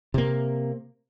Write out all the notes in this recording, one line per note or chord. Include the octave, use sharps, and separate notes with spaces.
C3 A#3